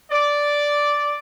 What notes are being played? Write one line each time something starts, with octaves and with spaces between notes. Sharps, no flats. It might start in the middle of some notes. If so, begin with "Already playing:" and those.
D5